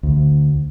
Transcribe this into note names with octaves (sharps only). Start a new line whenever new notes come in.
D2